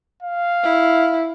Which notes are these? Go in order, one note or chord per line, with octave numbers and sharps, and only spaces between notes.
F5
E4